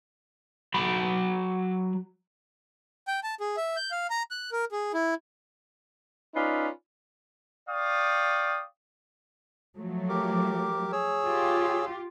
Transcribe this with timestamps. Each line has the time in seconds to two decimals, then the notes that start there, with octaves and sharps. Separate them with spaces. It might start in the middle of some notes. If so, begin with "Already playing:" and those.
0.74 F#3 B5
3.08 G5
3.23 A5
3.40 G#4
3.57 E5
3.76 G6
3.91 F5
4.10 A#5
4.31 F#6
4.52 A#4
4.72 G#4
4.94 E4
6.34 C#4 D#4 F4 B4 D5
7.69 D5 F5 G5 C#6 D#6
9.77 F3 F#3 A3
10.09 G4 A#4 D6
10.92 G#4 C#5 E6
11.26 F4 G4